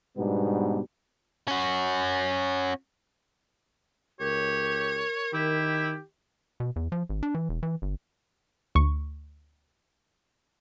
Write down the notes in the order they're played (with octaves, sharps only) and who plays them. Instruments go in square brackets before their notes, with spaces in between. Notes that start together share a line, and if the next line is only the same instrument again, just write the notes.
[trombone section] G#2 B2 G3 B3 D4
[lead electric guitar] C#4 F#4
[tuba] C#2 [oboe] G4 [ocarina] A#4 [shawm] C#5
[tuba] D#3 [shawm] E4 [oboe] G4
[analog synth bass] B2
E2
F3
G#1
D4
E3
E1
E3
G1
[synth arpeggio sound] D2 C#6